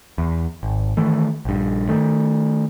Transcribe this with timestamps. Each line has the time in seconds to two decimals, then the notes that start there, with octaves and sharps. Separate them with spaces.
0.18 E2
0.63 G#1
0.97 D#3 E3 A3
1.45 A#1 G2
1.89 D#3 A3